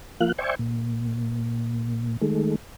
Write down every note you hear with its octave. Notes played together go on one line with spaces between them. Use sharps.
F3 A#3 F4 F5 F#6
C5 D5 E5 G5 G#5 C#6
A#2
D#3 G#3 A3